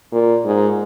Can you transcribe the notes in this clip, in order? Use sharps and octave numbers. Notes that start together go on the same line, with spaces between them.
A#2
G#2